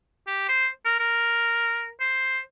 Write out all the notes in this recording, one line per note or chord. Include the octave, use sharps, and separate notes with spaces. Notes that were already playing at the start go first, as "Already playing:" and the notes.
G4
C5
A#4
A#4
C5